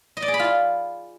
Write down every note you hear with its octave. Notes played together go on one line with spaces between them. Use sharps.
D#5
D5
G#4
B5
F4